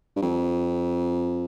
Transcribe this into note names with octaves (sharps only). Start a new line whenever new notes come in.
G2
F2